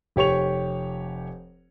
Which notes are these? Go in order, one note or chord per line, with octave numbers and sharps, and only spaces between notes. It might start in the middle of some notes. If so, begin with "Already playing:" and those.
F1 G4 C#5 C#6 F7